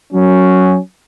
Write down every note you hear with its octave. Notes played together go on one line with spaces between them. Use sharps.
F#3 C#4